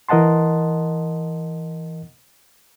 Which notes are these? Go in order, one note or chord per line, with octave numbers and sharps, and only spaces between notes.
E3 A#4 D#5 F#5 A5 C6